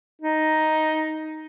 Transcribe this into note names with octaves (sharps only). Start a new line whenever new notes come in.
D#4